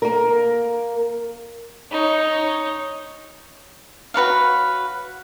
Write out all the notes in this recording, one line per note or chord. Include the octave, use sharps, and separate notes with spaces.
A#3 A#4
D#4 C#5
F#4 B4 C#5 F5